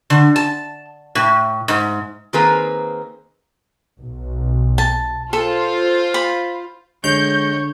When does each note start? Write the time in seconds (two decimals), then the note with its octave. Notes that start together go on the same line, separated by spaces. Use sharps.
0.10 D3
0.36 A5
1.15 A2
1.68 G#2
2.33 D#3 A#3 C4 G#4 B4 A#5
3.99 B1
4.78 A5
5.33 F4 A4 C5
6.14 B5
7.04 D3 G#3 C#5 G6 F7